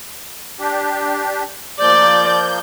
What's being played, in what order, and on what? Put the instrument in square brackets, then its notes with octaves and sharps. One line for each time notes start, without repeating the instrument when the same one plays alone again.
[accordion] D4 G4
[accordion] F3 A#3 G6 [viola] D5